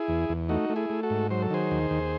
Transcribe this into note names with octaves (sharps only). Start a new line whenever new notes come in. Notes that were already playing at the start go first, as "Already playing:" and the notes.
Already playing: E4 G#4
E2
E2
A3 D#4 F#4
A3
E4 G#4
A3
F#4 A4
G#2
F#3 C5
A4
D#3 G#4 C5
D#2
D#2